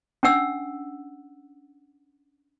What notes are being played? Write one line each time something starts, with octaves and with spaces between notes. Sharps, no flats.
C#4 D4 F#5 E6